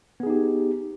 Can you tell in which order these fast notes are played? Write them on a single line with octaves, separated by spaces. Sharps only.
B3 G#4 D#4 G4